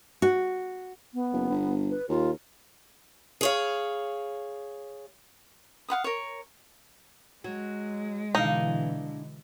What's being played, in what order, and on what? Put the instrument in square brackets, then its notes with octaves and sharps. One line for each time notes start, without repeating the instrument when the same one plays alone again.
[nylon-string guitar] F#4
[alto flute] B3
[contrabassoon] F#1
G1
[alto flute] B4
[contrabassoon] D#2 [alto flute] F4
[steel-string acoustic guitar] G#4 C#5 F5
[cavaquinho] F5 F#5 B5 D#6
A#4 C#5
[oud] F#3 [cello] G#3
[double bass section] B2 D3 E3 [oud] D4 F5 [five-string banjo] D#4